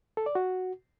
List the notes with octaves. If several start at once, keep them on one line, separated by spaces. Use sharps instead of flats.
A4
D5
F#4